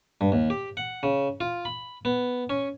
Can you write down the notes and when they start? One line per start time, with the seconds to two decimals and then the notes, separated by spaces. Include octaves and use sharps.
0.21 G2
0.32 D#2
0.50 G4
0.77 F#5
1.03 C#3
1.40 F4
1.65 B5
2.05 B3
2.50 C#4